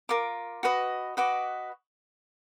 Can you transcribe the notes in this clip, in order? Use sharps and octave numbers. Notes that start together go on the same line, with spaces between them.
F4 A#4 D6
F#4 B4 D#5
F#4 B4 D#5 D6